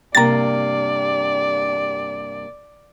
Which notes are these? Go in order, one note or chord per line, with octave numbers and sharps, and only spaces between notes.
G2 C3 A#3 D5 A#5 A6